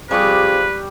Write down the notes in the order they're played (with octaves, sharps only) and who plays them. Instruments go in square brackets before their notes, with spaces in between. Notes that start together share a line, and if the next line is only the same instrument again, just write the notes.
[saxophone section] C3 F3 G#4 [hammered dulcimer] G3 C#6 D6 [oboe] B4